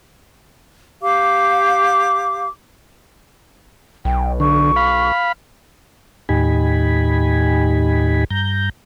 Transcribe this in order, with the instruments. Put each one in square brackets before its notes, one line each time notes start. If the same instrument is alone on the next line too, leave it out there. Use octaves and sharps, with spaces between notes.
[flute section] G4 F5 D6
[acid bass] B1 [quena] G5
[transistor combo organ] D3 [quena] C#6
[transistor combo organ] F5 B5
[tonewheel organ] D#2 A2 D#4 G4 G#5 B5
G2 A#5 G6